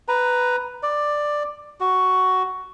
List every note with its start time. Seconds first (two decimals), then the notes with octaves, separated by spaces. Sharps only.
0.08 B4 A#5
0.83 D5
1.80 F#4